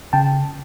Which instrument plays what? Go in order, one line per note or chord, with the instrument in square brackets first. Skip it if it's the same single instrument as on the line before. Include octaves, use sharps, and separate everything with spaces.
[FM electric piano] C#3 G5 A5